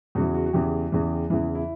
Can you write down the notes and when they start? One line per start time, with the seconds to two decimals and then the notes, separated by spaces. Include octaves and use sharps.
0.15 E2 C#3 E3 F#4
0.35 F#4
0.46 F#4
0.53 E2 C#3 E3 G4
0.92 E2 C#3 E3
1.30 E2 C#3 E3 E4
1.55 E4